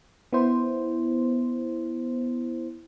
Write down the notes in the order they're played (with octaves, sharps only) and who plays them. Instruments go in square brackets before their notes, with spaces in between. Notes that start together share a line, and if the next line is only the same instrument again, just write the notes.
[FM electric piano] B3 E4 C5